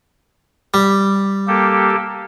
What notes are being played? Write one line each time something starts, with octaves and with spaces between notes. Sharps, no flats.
G3
A#3 G4 A4